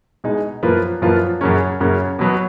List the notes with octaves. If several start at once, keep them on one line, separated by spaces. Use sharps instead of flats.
B2 G#3 D#4 G#4
F#2 F3 A#3 F4 B4
F#2 F3 A#3 F4 B4
F#2 C#3 F#3 A#3 C#4
F#2 C#3 F#3 A#3 C#4
B2 F#3 B3